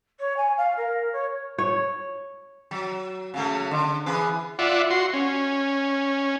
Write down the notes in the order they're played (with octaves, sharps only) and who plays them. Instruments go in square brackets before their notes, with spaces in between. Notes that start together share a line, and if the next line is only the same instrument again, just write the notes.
[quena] C#5
G#5
F5
A#4
C#5
[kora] C#5
[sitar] F#3
C#3 F#3 A3
D3
E3 G#4 B4
[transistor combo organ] F4 D5 E5 F#5
F#4 C6
C#4